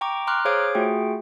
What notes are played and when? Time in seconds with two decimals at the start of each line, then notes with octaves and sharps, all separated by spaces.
0.01 G5 A#5 C#6 D6
0.27 A#5 C6 D6 F6 F#6
0.45 G#4 C5 C#5 F5 D6 D7
0.75 A3 F4 F#4 G#4 G5